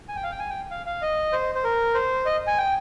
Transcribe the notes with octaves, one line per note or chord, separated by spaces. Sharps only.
G#5
G5
F5
G5
G#5
G5
F5
F5
D#5
C5
C5
A#4
C5
D#5
G#5
G5